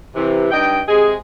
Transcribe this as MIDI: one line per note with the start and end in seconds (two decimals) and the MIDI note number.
0.15 0.50 48
0.15 0.50 52
0.51 0.81 43
0.51 0.81 63
0.51 0.81 75
0.51 0.81 79
0.89 1.14 48
0.89 1.14 56
0.89 1.14 68